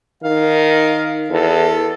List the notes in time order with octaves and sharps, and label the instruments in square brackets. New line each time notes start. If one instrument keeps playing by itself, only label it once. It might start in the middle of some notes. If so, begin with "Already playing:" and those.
[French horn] D#3 [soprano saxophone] F5
[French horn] E2 [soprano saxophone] A4